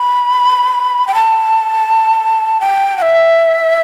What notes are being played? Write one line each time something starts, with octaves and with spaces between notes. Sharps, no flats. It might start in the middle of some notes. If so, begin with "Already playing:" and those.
Already playing: B5
G5
A5
G5
F#5
E5